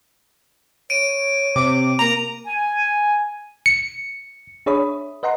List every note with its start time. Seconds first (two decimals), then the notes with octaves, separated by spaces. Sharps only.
0.90 C#5 D7 D#7
1.56 C3 D6
1.99 A#3 A#5 F7
2.46 G#5
3.66 C#7
4.66 D4 G#4 C#5 E5 B5 D#6
5.23 B4 D#5 F#5 A#5 C6